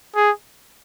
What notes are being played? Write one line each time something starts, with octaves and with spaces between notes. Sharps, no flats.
G#4